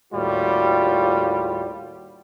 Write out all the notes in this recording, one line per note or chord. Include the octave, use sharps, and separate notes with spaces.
D#2 A2 G3 F4 F#4